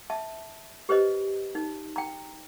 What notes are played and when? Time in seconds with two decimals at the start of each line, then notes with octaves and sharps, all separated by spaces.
0.10 E5 A5
0.89 G4 B4 C5 D#5
1.55 D#4
1.96 G5 A#5